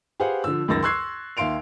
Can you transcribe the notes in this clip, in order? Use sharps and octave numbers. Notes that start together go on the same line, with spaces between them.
G4 G#4 B4 C5 F5 F#5
D3 F3 E6
C#2 F#2 D#3 E6 A6 A#6
C6 C#6 E6 F#6 G#6 C7
D#2 E5 F5 C6 D7 F7